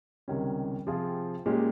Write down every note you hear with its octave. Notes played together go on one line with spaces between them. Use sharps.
C#2 C3 D#3 G3 C#4
C3 F3 C4 F4 G#4
A#2 G#3 C#4 G4